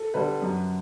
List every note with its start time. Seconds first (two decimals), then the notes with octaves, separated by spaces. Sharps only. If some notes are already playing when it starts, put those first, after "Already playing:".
Already playing: A4
0.14 D3 G3 B4
0.42 F#2